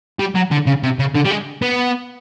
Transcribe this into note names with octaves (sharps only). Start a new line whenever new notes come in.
G3
F#3
D3
C#3
C3
C#3
D3
G3
G#3
B3